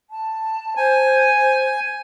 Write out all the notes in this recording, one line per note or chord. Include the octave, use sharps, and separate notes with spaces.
A5
C5 G#5